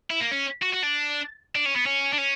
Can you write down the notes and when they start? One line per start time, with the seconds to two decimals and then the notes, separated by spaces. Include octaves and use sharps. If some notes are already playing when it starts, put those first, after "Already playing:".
0.10 E4
0.21 A#3
0.31 C#4
0.62 F#4
0.73 F#4
0.83 D4
1.56 D4
1.66 C#4
1.76 B3
1.86 C#4
2.13 D4
2.18 C#4